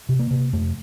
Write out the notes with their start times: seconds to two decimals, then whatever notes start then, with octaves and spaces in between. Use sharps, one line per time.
0.09 C3
0.19 A#3
0.30 C3
0.53 F2 A3